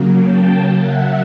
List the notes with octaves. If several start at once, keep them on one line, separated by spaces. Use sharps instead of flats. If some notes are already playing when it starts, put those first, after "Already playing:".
Already playing: C#3 F#3 A#3
G5 A5
E5 F#5